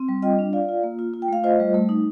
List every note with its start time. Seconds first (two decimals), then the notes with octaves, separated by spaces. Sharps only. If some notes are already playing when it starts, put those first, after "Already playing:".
Already playing: C4
0.09 G3
0.22 F4 D#5 G5
0.39 D4
0.53 F4 D5 F5
0.69 F4
0.83 A#3
0.99 F4
1.14 F4
1.22 G5
1.28 A3 F5
1.44 F4 C5 D#5
1.60 G3
1.74 A3
1.89 D#4